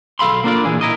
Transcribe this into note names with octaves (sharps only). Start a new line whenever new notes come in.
B1 A4 F5 B5 C6
A#3 D4 F4 D5
A#2 E3 E4 G#4
E4 A#4 D#5